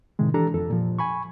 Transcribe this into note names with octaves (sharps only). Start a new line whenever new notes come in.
A2 C3 D#3 G#3
E3 D4 G4 A4 A#5
F2 A4
A#2 F3
G#5 B5 C#6